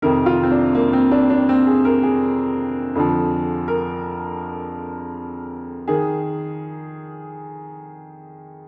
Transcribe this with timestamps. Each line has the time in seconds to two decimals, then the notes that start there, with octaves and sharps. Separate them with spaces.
0.02 F2 C3 D#3 A#4
0.26 F4
0.43 C4
0.51 D4
0.75 A#3
0.93 C4
1.11 D4
1.30 D4
1.49 C4
1.67 G#4
1.85 A#4
2.03 G#4
2.95 F2 D3 F3
3.68 A#4
5.88 D#3 G#4